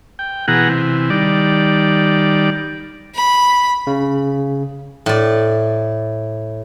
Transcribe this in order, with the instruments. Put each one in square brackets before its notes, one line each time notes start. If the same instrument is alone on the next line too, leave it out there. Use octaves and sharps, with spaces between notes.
[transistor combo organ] G5
B2 E3 G#4 F#5 A#5
C3 E3
D#3 G3 D5
[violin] B5
[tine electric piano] C#3
[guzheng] A2 D5